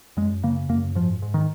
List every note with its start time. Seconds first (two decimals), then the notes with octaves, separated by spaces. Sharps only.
0.17 F#2 G#3
0.43 C#3 A#3
0.69 F#2 A#3
0.95 G#2 F3
1.22 G#2
1.34 D#3